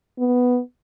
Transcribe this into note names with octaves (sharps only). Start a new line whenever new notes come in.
B3